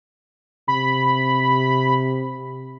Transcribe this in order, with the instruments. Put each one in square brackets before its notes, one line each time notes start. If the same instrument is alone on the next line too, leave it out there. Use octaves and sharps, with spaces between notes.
[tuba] C3 [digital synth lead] B5